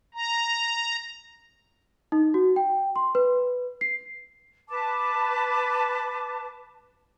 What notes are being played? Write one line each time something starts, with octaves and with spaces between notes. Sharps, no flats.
A#5
D#4
F#4
G5
C6
B4
C7
B4 A5 D6